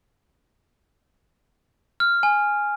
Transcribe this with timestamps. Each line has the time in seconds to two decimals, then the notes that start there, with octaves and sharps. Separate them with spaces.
2.00 F6
2.23 G#5